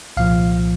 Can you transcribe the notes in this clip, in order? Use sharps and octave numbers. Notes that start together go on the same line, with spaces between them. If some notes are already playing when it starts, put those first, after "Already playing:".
C2 A#2 F3 F5